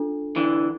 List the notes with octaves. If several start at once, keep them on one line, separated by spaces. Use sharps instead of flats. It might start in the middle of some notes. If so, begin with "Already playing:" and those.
Already playing: D4 F4 A4
D3 E3